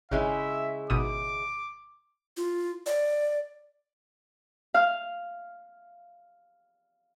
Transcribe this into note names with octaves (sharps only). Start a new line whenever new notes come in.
G#1 C#3 G#3 E4 E5
G#1 B2 D6 D#6
F4
D5
F5 F6